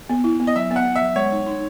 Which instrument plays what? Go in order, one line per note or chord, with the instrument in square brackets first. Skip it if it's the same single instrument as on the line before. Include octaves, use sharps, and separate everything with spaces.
[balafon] B3
E4
B3
[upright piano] D#5
[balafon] F#3 [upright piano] E5
[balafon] B3
[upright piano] F#5
[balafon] B3
[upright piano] E5
[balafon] F#3
[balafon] G#3 [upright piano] C#5
[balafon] D#4
D#4